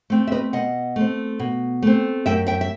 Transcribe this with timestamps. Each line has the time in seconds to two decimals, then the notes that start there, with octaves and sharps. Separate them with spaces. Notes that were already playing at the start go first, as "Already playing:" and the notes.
0.10 A3 C4
0.27 E5
0.32 B4 D#5
0.53 B2 D#5 F#5
0.96 A3 C4
1.39 B2
1.83 A3 C4
2.26 F#2 E5 G5
2.47 E5 G5
2.61 E5